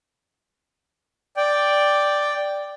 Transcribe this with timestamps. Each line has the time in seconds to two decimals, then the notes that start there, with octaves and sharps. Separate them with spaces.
1.37 D5 G5